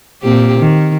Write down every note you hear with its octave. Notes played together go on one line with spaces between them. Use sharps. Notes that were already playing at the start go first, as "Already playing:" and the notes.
A#2 C4 G4
D#3